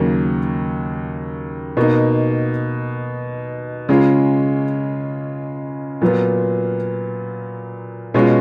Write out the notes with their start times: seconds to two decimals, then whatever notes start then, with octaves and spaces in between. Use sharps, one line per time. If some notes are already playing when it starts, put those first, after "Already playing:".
Already playing: D#2 C#3 F#3 A#3
1.77 B2 A#3 D#4
3.89 C#3 G#3 C#4 F4
6.02 A#2 F#3 B3 F4
8.14 B2 G#3 C#4 F4